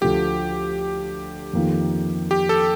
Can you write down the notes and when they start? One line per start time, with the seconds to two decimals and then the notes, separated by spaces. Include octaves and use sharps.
0.01 D2 D3 F3 A3 G4
1.53 F2 D#3 A#3 F4
2.31 G4
2.49 A4